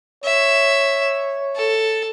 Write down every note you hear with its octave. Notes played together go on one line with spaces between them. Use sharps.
C#5 E5
A4